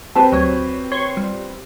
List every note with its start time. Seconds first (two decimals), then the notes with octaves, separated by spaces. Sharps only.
0.15 C4 G4 B4 A5
0.32 D2 F#3 F#4 C#5
0.92 C#5 C6 C#6
1.17 G3 F4